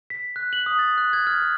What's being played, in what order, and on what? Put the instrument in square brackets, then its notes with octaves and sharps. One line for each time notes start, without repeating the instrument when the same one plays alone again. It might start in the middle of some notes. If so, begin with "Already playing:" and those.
[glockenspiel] B6
F#6
F#7
D#6
A6
F#6
G#6
F6
F6